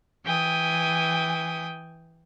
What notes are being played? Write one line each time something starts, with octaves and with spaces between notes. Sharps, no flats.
E3 G5 G#5 D#6